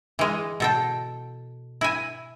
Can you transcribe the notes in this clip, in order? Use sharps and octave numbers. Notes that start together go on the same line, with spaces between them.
E3 G#3
B2 A4 G5
E4 G#5